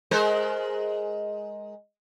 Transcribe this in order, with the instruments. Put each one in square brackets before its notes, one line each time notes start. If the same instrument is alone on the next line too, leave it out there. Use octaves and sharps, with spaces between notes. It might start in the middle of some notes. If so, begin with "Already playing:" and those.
[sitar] G#3 A#4 C5